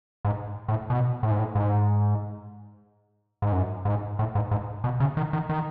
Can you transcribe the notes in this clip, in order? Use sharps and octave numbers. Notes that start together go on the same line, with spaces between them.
G#2
A2
B2
A2
G#2
A2
G#2
G#2
F#2
G#2
A2
G#2
G#2
B2
C#3
D#3
D#3
D#3